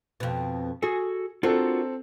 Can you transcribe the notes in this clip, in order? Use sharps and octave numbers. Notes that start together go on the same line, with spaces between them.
F2 B2
F#4 G#4 A4
C4 D4 F4 F#4 A4 A#4